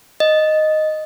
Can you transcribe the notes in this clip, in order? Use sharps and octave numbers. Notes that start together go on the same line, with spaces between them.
D#5